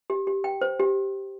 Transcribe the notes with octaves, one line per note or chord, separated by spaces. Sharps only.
G4
G4
G5
C5
G4